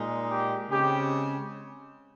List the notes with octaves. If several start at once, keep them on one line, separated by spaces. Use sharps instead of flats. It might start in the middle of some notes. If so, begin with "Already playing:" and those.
Already playing: A#2 G#3 D#4
G4
C#3 G#3 C4 G4